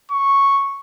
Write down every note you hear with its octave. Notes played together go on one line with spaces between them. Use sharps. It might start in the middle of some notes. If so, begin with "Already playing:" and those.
C#6